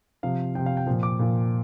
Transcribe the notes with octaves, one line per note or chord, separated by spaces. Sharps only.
C3 F3 F5
C3 F3 G5
F5
G5
A#2 F3
D6
A#2 F3